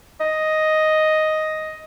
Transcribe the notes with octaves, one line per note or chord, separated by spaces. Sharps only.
D#5